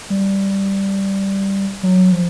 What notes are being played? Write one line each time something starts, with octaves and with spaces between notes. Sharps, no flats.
G3
F#3
F3